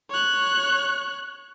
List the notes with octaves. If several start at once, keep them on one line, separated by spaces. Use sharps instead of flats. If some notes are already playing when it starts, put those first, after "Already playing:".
C#5 F#6